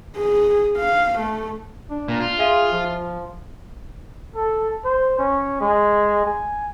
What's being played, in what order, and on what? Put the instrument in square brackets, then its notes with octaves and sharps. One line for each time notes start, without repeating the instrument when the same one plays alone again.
[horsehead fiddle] G#4
F5
A3
[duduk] D4
[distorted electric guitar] A#2
F4
[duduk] G#4 [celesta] E5 F5 D#7
[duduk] F3
[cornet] A4
C5
C#4
G#3
G#5